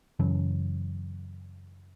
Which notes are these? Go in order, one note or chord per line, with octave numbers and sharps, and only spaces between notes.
F#2 C#3 E3 F#3